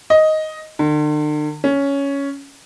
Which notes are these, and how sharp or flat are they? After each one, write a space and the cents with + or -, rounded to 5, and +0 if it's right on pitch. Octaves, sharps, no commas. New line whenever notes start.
D#5 +5
D3 +45
C#4 +10